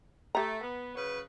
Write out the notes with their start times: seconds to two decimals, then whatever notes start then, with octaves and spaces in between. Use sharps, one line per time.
0.35 A3 G4 A#5
0.60 B3
0.95 C#3 F#3 B4